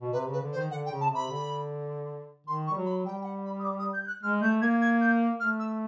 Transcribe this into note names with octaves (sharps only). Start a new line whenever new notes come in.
B2
C3 B4
C#3
B4
D3
C5
D#3
D3 F#5
G5
C#3
A5
C3 B5
D3
D#3 C6
C#6
G3
F#3
B5
G3 G5
G5
F#5
B5
D#6
D6
D#6
G6
G6
F#6
G#3 F6
A3 G6
A#3 G#6
G#6
G6
A3 F6
E6